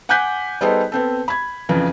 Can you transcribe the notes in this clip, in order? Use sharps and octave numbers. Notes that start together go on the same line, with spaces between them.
F#5 G#5 D6 F#6 G6 B6
G3 B3 D#4 G#4 A4 C5
B3 C4 A4
B5 G#6
F2 C#3 E3